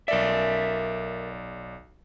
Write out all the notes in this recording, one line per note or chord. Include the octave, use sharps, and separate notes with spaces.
B1 A#4 D5 E5